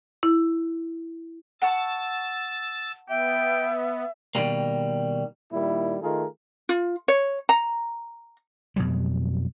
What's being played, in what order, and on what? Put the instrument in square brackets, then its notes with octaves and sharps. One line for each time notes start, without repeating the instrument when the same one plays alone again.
[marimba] E4
[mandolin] F#5 A5 C#6 [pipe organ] E6 A6
[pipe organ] B3 [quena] E5 [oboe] G5
[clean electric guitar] B2 D#3 E3 F#3 G3 A#3
[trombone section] A#2 D#3 G3 E4
D#3 A3 F4 G#4 A#4
[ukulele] F4
C#5
A#5
[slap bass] F2 B2 F#3 G3